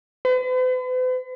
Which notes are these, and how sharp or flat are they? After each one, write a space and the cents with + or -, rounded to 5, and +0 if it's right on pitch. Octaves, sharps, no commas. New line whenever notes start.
B4 +45